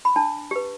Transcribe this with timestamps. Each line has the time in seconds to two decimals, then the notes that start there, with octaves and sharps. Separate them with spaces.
0.05 B5
0.16 D4 A5
0.51 G4 B4